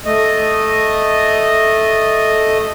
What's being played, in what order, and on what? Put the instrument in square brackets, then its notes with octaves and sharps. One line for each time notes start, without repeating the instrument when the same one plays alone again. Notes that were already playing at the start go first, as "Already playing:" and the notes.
[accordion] A3 D#5